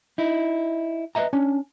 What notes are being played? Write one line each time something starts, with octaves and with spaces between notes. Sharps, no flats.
D#4 E4
B4 C5 D#5 E5 A#5
C#4 D4